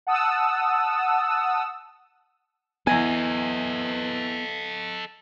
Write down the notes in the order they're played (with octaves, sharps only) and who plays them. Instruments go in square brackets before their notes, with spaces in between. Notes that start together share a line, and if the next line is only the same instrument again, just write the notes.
[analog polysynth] F#5 A5 D#6 E6
[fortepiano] E2 G#5 [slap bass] B3 [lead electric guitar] A4 D#5